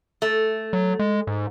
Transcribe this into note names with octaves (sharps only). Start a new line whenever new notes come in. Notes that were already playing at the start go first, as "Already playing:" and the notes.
A3
F#3
G#3
G#2